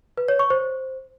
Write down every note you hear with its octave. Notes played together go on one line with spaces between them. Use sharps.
B4
C#5
C#6
C5